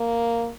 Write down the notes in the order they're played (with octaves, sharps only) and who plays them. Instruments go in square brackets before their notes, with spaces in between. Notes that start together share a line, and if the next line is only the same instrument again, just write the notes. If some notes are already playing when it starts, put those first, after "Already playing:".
Already playing: [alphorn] A#3